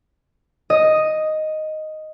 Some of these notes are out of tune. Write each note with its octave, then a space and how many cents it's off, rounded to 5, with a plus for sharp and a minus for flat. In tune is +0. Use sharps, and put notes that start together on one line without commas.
D#5 +0